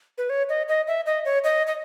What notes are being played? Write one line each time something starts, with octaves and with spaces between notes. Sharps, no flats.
B4
C#5
D#5
D#5
E5
D#5
C#5
D#5
D#5